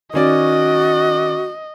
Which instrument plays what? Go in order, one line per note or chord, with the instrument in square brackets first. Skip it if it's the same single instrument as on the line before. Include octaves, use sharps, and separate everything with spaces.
[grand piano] D#3 C#4 D5 [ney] F#4 [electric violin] D#5